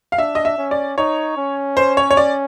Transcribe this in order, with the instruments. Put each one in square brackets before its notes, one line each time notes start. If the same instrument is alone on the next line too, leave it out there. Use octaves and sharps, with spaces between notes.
[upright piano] F5
[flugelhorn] D4 [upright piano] E5
[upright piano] D#5
E5
[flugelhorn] C#4
[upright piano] D5
[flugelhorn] D#4 [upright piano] C#5
[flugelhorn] C#4
[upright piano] C5
C#5
C#5
D5